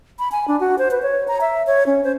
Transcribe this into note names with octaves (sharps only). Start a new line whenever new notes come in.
B5
G#5
D4
F#4
C5
B4
C#5
A#5
E5
C#5
C#4
C5